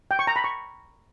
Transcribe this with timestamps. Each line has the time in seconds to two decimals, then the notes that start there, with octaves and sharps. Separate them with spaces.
0.11 G5
0.19 C#6
0.27 A#5
0.36 B5
0.44 C#6